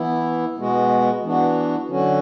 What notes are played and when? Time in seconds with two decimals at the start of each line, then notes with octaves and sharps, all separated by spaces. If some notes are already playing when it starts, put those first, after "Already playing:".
Already playing: E3 B3 E4
0.58 B2 G#3 B3 F#4
1.23 E3 B3 D4 F#4
1.89 D3 F#3 C#4 F#4